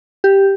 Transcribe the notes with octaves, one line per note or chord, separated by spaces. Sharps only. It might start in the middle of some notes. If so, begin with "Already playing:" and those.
G4